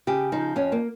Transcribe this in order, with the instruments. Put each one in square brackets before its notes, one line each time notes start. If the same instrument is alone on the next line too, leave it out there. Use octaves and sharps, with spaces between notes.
[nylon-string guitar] C#3 G4
F3 D#4
F2 C#4
A#3